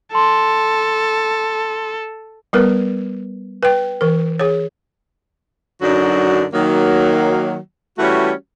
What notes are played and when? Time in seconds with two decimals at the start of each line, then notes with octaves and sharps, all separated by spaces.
0.13 A4 A5 C6
2.53 G3 B3 A#4 B4
3.63 B4 G5
4.01 E3 A#4
4.39 G#4 C#5
5.81 F#2 D3 F#3 D4 D#4 F#4
6.53 D#3 F#3 A#3
7.98 E3 G3 A3 C#4 F#4